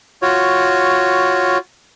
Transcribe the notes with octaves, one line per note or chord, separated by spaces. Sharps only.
F4 F#4 C#5